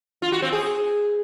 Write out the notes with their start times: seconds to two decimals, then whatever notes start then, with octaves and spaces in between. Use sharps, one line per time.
0.22 F4
0.32 F#4
0.42 C4
0.52 G#4